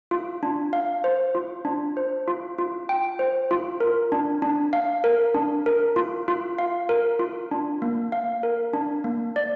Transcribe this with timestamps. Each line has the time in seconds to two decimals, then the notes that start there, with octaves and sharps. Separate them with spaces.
0.11 F4
0.43 D4
0.73 F5
1.04 C5
1.35 F4
1.65 D4
1.97 C5
2.28 F4
2.58 F4
2.89 G5
3.19 C5
3.51 F4
3.80 A#4
4.12 D4
4.42 D4
4.73 F5
5.04 A#4
5.35 D4
5.66 A#4
5.96 F4
6.28 F4
6.58 F5
6.89 A#4
7.19 F4
7.51 D4
7.82 A#3
8.12 F5
8.43 A#4
8.73 D4
9.04 A#3
9.36 D5